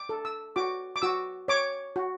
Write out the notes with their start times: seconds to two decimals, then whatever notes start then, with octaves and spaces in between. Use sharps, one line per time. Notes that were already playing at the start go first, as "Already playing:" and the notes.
Already playing: D6
0.09 A4
0.25 E6
0.56 F#4 D6
0.96 D6
1.02 F#4 E6
1.48 C#5 D6
1.96 F#4